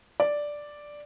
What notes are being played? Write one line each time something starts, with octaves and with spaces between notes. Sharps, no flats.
D5